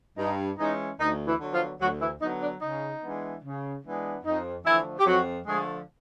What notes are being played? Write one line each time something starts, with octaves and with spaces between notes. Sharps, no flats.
G2 D#4
E3 G#3 C#4 D#4
D2 D#4
E3 E4
D3 F#3 B3
F3 F4
D2 F#3 F#4
E3 E4
D3 F#3 B3 D#4
D4
C#3 D#4
E3 G#3 B3 D4
C#3
E3 G#3 B3 D4
F2 D#4
D3 E3 F3 A3 E4
G4
F2 F#3 F#4
D3 F3 G#3 A3 G#4